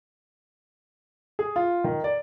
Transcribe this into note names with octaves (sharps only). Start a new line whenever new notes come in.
G#4
F4
D#3
D5